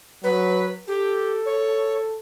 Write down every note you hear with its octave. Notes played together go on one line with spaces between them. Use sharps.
F#3 B4
G4 A4
C#5